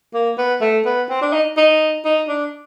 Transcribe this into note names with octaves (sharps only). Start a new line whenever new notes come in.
A#3
B3
A3
B3
C4
D4
D#4
D#4
D#4
D4